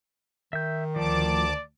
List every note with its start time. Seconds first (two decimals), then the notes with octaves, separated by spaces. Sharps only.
0.53 D#3 E5 G6
0.96 D2 F3 D5 A5 D6